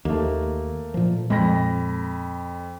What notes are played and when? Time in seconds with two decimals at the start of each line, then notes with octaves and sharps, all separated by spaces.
0.05 D#2 A3 A#3
0.94 A#2 F3
1.30 F2 A#2 G#3 B5 A#6